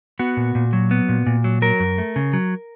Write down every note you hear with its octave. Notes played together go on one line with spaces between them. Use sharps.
B3 F#4
A#2
A#2
F#3
B3
A#2
A#2
F#3
F#3 A#4
F#2
A3
C#3
F#3